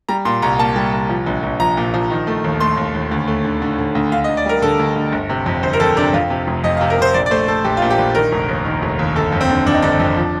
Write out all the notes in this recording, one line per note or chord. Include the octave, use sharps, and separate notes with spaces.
G3 A#5
A#2 C6
C2 A#5
A#3 A5
G3
C2
F3
A#1
A#1
F3 A#5
A#2
F3
D#3
A3
D#2
A3 C6
D#2
D#2
D2
A3
D3
D3
D3
D2
D3 F5
D#5
D2
D5
G3 A#4
D3 A4
D2
D2
G1
C3
F2
G1 C5
A#4
F2 A4
C3 D4
F2 F4
C3
F1
F2 D#5
F5
C3
A#4
C3 C5
A#1 D5
D5
A3 C5
A3 A4
A#1 G4
F4
A#2
G4
A#1
D#3 A#4
F1
D#2
D#3
F1
D#2
G1 A4
F2
C4
D3
F2 D4
D#4
G1 D4
F2
F3